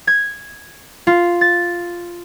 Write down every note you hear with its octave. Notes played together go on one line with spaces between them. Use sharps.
G#6
F4
A6